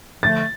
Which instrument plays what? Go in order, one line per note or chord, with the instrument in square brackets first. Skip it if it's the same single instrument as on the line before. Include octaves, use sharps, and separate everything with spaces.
[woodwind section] D3 F3 A3 [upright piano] A6